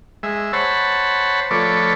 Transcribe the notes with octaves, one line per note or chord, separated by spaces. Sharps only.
G#3 E5
C5 C#5 F#5 A5 B5
F3 A3 A4 B4 C#5 D5